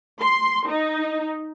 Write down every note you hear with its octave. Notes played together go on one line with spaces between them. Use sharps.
C6
D#4